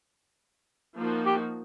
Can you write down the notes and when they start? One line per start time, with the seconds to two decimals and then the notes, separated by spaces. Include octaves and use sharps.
0.97 F3 A#3 D#4 F#4
1.26 G4